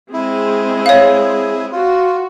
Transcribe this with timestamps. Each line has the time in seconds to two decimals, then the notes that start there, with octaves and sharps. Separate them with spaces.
0.14 G#3 C4 E4 G#4
0.86 C#5 F5
1.72 F4 F#4